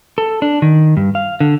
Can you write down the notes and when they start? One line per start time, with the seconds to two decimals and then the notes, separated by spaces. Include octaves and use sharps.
0.18 A4
0.42 D4
0.62 D#3
0.97 G2
1.15 F5
1.40 D3